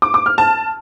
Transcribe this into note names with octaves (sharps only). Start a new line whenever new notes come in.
D6
D6
F6
A5